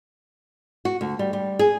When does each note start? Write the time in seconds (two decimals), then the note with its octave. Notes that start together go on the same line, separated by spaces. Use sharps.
0.85 F#4
1.01 D2
1.19 G3
1.33 G3
1.59 G#4